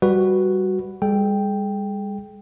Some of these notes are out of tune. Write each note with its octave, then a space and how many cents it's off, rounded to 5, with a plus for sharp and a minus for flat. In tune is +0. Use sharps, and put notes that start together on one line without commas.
G3 +0 F#4 +0 B4 +0
G3 +45 G#4 +45 G5 +0